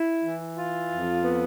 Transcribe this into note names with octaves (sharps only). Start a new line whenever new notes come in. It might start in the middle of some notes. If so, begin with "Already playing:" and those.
Already playing: E4
E3
F4
F2
B3